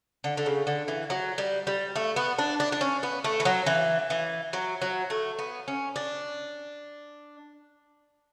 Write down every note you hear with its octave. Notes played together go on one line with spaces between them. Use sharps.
D3
D3
C#3
D3
E3
F#3
G3
G3
A3
B3
D4
D4
D4
C#4
B3
A3
E3
F#3
E3
E3
F#3
F#3
A3
B3
C#4
D4